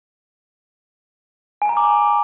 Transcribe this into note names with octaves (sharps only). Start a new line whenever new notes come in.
G#5
A#5
D6